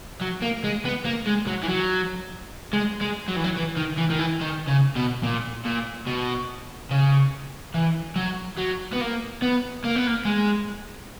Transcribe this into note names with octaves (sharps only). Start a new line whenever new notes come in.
F#3
A#3
G#3
B3
A#3
G#3
F#3
E3
F#3
G#3
G#3
F#3
E3
F#3
E3
D#3
E3
D#3
E3
D#3
C#3
B2
A#2
A#2
B2
C#3
E3
F#3
F#3
B3
A#3
B3
A#3
B3
A#3
G#3